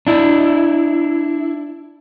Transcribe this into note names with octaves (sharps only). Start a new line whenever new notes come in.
D4 E4